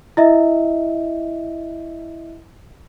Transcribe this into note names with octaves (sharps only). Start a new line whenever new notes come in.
E4 D#5 E5